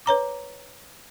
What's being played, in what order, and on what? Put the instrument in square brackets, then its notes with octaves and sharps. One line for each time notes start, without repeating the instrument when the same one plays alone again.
[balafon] B4 C#5 A#5 D6